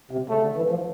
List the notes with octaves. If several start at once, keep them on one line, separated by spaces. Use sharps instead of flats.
C3
C#3 A3
D3
E3
F3